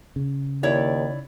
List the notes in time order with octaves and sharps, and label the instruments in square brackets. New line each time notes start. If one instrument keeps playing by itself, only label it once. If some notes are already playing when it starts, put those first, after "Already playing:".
[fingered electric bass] C#3
[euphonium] D#2 [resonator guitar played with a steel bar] E4 C#5 D5